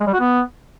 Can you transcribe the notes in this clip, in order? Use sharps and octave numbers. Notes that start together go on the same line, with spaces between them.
G#3
G3
F#4
B3